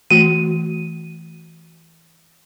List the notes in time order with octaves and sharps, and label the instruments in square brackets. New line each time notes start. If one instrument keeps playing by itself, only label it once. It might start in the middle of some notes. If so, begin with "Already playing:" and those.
[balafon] E3 A3 F#4 [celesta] D#7